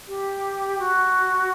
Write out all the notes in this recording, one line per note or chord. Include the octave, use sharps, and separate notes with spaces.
G4
F#4